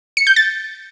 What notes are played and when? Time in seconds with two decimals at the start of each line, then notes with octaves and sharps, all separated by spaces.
0.17 C#7
0.27 G6
0.36 A6